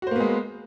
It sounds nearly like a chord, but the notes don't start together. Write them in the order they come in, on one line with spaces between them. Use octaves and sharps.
F#4 C5 A#3 B3 G#3